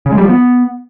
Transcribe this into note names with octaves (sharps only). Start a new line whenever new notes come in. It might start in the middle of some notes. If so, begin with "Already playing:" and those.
C#3
G#3
G3
F3
B3